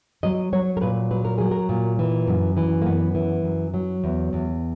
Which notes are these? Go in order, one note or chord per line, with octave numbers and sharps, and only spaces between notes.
F#3 D#5
F#3 C#5
A#4
A#2 B4
F#3 B4
A#4
F#3 G#4
A#4
A#2
E3
F#2
E3
A#3
F#2 B3
E3
F#2
F#3
E2
E2